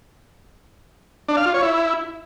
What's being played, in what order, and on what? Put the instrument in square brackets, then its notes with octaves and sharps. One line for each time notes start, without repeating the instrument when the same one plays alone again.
[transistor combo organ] D4
F5
F4
C#5
E4